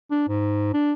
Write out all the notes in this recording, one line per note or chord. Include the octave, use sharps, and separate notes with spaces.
D4
G#2
D4